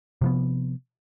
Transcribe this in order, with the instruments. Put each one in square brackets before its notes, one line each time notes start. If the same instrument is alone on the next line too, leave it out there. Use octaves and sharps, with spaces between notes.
[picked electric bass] C3 F3 B3